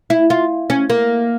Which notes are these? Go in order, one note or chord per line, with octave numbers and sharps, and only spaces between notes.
E4
F4
C#4
A#3